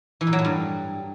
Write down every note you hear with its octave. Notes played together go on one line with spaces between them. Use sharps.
E3
A#2
F#3
A2
G2